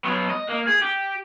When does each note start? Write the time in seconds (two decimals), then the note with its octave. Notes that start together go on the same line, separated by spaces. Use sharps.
0.05 F#3 B3
0.30 D#5
0.49 A#3
0.67 G#4
0.82 G4